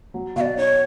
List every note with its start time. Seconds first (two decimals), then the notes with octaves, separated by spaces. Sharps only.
0.14 F#3
0.36 B2 F5
0.41 D5
0.57 D#4 C#5